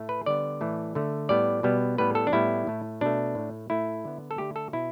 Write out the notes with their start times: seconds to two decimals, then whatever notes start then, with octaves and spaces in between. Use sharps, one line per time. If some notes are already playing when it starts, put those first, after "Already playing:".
Already playing: A2 A3
0.09 B4
0.26 D3 G3 B3 D5
0.61 A2 E3 A3
0.95 D3 A3
1.29 A2 G3 B3 D5
1.63 B2 G3 B3
1.98 A2 G3 B3 B4
2.15 A4
2.27 D4
2.32 A2 G3 B3 E4
2.67 A2 A3
3.01 B2 A3 D4
3.35 A2 A3
3.70 A2 A3 E4
4.05 D3 B3
4.31 A4
4.38 D3 A3 G4
4.56 A4
4.73 B2 E4